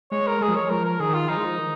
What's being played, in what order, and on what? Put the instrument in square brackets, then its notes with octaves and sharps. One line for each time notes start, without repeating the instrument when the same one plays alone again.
[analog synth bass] G#3 [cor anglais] C#5
[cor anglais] A#4
[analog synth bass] G#3 [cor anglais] G#4
[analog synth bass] F3
[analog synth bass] G#3 [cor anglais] C#5
[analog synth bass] F3 [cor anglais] A#4
[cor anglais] A#4
[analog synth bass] D#3 [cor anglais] G#4
[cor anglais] F4
[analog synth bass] F3 [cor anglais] D#4
[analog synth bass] G#3
F3
D#3